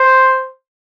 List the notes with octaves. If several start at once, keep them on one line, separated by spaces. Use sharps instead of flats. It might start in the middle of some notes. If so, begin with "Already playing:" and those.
Already playing: C5